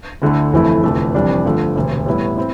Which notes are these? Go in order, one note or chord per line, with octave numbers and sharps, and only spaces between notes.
D2 D3 A3 E4
G1 F2 E3 A3 E4
F1 E2 D3 F3 A3
F1 F2 E3 G3 D4
G2 D3 F3 A3
E1 D2 C3
A2 E3 G3 B3 E4
C4 E4